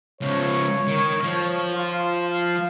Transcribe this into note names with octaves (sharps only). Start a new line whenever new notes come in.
C#2 F3 C#5
D#3
F3
F4
F5